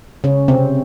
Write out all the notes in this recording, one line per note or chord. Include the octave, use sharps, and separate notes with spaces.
C#3 C#4
C3 C4